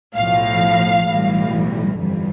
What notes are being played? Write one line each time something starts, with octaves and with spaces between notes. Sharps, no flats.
B1 A2 F3 F5
B1 A2 E3 G3
G1 F2 E3 G3